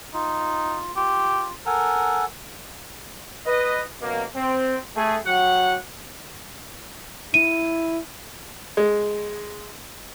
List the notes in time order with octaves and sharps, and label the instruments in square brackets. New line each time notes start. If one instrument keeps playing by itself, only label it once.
[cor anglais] D#4 [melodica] F4
[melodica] F4 [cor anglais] G4
[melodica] A4 F#5 G#5 [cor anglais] A#4
[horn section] B4 D#5
F#2 B2 A#3
C4
A3 G#4
F#3 F#4 G4 F#5
[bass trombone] E4 [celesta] D#7
[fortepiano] G#3